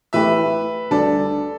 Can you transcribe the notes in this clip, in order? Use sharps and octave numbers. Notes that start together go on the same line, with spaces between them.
A2 E3 A3 G4 B4 E5
D2 D3 G3 A4 D5